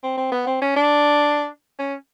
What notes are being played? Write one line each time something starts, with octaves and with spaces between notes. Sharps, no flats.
C4
C4
B3
C4
C#4
D4
C#4